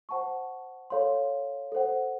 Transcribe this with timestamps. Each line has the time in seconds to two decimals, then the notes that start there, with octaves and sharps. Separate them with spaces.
0.09 C5 F#5 A5 C#6
0.90 A4 C#5 F5 C6
1.72 A4 C5 F#5